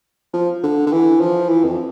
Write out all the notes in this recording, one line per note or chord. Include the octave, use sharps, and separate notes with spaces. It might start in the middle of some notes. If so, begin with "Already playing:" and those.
F3
D3
D3
E3
F3
E3
F2